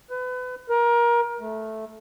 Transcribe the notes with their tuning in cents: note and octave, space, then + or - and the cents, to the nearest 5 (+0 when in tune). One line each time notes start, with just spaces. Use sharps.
B4 +30
A#4 +25
A3 -5